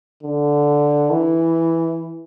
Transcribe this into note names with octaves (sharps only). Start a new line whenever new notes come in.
D3
E3